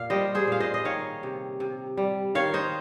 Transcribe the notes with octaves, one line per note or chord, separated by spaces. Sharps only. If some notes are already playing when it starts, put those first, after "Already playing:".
Already playing: A#2 F5
G3 C5 D#5
G#4 C5
A#2 F5
C5 D#5
D#5
D#3 C#5 F5
C3
C3
G3
D#3 C#5 F5
C5 D#5